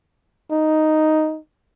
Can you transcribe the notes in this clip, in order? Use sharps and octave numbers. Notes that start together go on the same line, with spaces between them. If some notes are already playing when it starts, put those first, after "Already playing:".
D#4